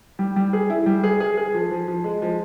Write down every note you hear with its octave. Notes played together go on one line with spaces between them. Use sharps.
G3
G3
G#4
E4
G3
G#4
G#4
G#4
F3
F3
F3
G#3
F3